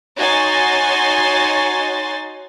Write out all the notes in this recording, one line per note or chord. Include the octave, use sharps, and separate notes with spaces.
D#4 F#4 C#5 G#5 C6 A6